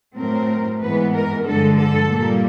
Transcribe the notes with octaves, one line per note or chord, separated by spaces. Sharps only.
A2 F#3 A3 C4 A#4
G#2 E3 G#3 B3 B4
A#4
G2 D3 F3 G#3 A4
A4
A#2 G3 A#3